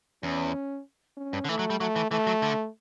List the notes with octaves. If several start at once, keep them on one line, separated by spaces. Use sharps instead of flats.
E2 C#4
C#4
G2
D3
E3 A3
F#3
G3
F#3 A3
E3
E3 A3
F#3
D3